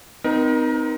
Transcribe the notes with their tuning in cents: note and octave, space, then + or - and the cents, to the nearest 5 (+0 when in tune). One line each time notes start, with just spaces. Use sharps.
C4 -40 D#4 -5 A#4 +30